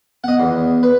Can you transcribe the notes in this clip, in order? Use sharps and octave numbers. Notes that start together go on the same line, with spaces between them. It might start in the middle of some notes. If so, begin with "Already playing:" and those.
B3 D#5 F#5
E2
B4